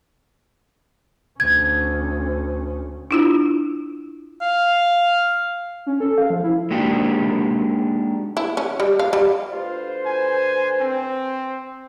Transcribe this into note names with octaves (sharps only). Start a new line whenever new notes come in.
D2 C#4 G#6
D4 E4 F4
F5
C#4
A4
F5
F3
E4
G#3 A#3 D4 D#4 F#4 G4
E4
C#4
G3
F5
G3
D2 F4 B4 C5
G#5
C4